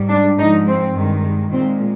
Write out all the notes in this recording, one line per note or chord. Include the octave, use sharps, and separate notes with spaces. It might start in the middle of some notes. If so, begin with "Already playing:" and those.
Already playing: G#2 G3
D4
G#2 F3 G#3 D#4
C4
G2 D#3 G#3
A#2 G#3 C4